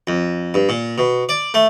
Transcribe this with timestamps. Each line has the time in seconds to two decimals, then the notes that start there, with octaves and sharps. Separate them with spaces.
0.07 F2
0.54 G2
0.69 A#2
0.98 B2
1.29 D5
1.54 A3